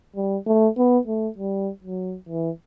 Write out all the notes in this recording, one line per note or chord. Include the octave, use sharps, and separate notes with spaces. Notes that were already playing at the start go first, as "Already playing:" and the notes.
G3
A3
B3
A3
G3
F#3
E3